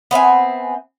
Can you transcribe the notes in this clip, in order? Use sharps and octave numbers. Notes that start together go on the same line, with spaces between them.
B3 C4 E5 G#5